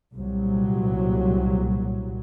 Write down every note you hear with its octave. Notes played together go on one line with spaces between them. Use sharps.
C2 A#2 F#3